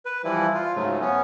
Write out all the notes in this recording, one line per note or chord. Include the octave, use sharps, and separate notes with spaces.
B4
E3 F3 G3 E4
F4
G#2 C#3 F#3 A3
B3 C#4